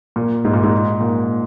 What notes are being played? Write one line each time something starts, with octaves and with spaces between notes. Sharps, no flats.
A#2
G#2
A#2
G#2
A#2